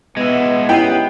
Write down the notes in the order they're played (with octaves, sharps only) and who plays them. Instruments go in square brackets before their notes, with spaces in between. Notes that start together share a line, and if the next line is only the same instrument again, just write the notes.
[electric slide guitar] G#3 E4 [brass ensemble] B3
[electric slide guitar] B3 [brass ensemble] C#4 D#4 G4 [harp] E4 C7 [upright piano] G5